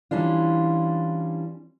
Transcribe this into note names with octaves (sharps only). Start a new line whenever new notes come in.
E3 G3 C#4 D4 F4